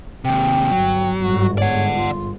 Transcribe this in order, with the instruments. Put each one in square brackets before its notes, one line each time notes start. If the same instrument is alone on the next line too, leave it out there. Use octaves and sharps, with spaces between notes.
[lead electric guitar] D#2 C3 [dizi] G5
[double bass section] G1 [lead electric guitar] F#3
[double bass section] G1 G#2 [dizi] F#4
[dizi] C#5 [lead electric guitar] D5 F#5
[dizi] F4